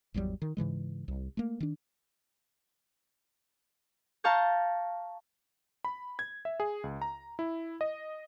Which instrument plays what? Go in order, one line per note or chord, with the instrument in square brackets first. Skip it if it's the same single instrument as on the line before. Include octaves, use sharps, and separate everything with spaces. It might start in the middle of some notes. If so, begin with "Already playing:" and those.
[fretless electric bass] G#1 E2 F#3 G3
D#3
G#2 C#3 E3 G#3
C2
A3 A#3
D#3 D4
[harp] F5 A5 A#5 C#6 G6
[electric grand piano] B5
G#6
E5
G#4
C#2
A#5
E4
D#5